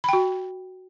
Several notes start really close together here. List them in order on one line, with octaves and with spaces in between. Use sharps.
B5 G5 F#4